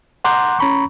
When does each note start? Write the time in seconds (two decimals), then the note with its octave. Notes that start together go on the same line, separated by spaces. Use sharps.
0.24 F#5 A#5 C6 D6 F#6 G6
0.59 C#4 A#5 B5 C#6